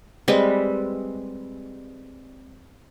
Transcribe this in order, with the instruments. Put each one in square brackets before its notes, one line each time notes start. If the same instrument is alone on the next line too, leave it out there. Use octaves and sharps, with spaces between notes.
[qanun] G3 G#3 C4 B4